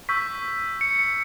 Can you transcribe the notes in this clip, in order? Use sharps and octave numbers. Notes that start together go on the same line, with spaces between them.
C#6 E6 G6 B6
C#7
C#7